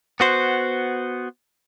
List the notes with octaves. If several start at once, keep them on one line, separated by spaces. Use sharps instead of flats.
B3 F#4 C5